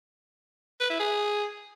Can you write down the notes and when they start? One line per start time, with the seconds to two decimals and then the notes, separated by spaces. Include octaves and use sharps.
0.80 B4
0.90 E4
1.00 G#4